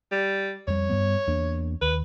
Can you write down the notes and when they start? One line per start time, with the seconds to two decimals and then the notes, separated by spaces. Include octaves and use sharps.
0.12 G3
0.68 F2 G3 C#5
0.89 G2 G3 B3
1.27 E2 A#3 D4
1.82 D#2 B4